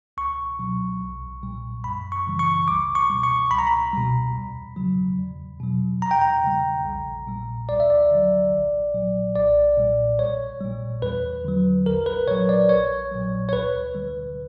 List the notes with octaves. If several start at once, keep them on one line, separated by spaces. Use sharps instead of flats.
C#2 C#6
B2 F#3
B1
A#2 G3
F#2 B5
C#6
C#3 E3 G3
C#6
C#2 D6
C#6
B2 G3
C#6
C#2 B5
A#5
B5
B2 G3
E2
C#3 F#3
E2
B2 F#3
E2 A#5
G5
A#5
C#3 G3
A#1
A#2 G3
D2 D5
E5
D5
D3 F#3
A#1
A#2 F#3
B1 D5
A#2 G3
A#1 C#5
A#2 G3
E2 B4
D3 F#3
A#1 A#4
B4
A#2 F#3 C#5
D5
A#1 C#5
A#2 F#3
C#5
D2 B4
D3 G3